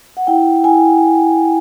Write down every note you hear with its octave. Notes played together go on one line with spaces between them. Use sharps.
F#5
E4 G5
E4 G#5